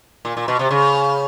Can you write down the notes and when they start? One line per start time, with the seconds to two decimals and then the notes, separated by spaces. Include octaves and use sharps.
0.25 A#2
0.37 A#2
0.48 B2
0.59 C3
0.71 C#3